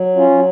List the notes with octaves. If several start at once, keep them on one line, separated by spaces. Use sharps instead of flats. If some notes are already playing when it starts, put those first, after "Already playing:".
Already playing: F#3
C#4 F4
F#3